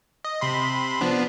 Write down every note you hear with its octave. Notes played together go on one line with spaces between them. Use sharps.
D#5
C3 B5 C6
F3 B3 D4